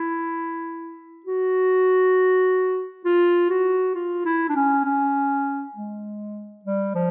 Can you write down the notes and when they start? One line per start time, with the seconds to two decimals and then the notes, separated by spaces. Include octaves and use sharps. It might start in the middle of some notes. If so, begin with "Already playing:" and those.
Already playing: E4
1.26 F#4
3.05 F4
3.50 F#4
3.95 F4
4.25 E4
4.49 D4
4.56 C#4
4.85 C#4
5.76 G#3
6.65 G3
6.95 F3